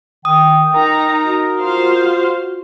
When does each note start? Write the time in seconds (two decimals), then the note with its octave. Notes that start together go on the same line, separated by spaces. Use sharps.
0.25 D#3 G5 D#6
0.74 D#4 A#4 A#5
1.24 F#4
1.58 F4 C5 F5